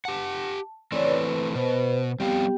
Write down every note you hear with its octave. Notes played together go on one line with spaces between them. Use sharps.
G4 F#5 A5
E3 A3 C4 C#5 D5
B4
B2 B4 C5
G3 B3 C4 G4 F5 G5